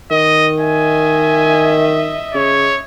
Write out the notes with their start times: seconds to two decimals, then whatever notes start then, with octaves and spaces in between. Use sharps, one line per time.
0.11 D#3 D#5
0.59 D#5 E5 G#5
2.34 C#3 C#5